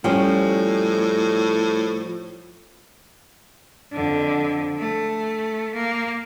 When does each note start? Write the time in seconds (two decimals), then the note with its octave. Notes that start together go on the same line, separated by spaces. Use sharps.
0.04 A2 F3 G3 C#4
3.93 F2 D3
4.78 A3
5.75 A#3